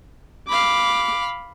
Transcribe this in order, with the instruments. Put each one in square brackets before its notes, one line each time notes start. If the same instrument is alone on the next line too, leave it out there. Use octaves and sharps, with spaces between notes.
[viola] F5 B5 [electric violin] D6